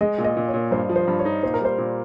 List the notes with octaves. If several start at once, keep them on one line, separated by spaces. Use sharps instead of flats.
G#3 D#5
A#2
D#5
A#2
C#5
A#2
G2 C5
F3
C5
G2
C#5
D#4
A#2 C5
A#4
G3 C5
A#2